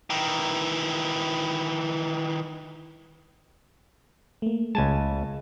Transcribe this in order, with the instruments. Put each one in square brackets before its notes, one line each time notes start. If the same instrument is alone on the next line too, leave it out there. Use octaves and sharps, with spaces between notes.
[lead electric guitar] D#3 E3
[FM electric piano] A3 A#3
[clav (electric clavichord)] C#2 G#5 A5 [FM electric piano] G#3